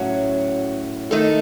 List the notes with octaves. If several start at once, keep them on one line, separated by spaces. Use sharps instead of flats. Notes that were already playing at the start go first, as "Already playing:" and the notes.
Already playing: A2 F#3 C#4 F#4
D#3 A3 D#4 A4